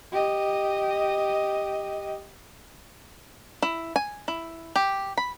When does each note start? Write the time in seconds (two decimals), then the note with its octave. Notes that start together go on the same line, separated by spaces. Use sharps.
0.12 G4 D#5
3.63 E4
3.96 G#5
4.28 E4
4.76 G4
5.18 B5